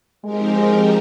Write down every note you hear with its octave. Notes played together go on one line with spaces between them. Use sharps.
F3 G#3 C4 D#4 G4 A#4